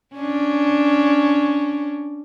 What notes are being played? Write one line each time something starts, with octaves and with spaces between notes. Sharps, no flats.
C#4 D4